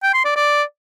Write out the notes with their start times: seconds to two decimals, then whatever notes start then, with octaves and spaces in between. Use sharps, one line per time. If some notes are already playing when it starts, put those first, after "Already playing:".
0.03 G5
0.14 C6
0.25 D5
0.36 D5